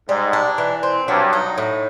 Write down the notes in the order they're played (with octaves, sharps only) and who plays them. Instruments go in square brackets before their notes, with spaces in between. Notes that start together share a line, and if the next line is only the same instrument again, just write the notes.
[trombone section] G#2 [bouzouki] G3
[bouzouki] D4
E3
C4
[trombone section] G2 [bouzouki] F#3
[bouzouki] D#4
A2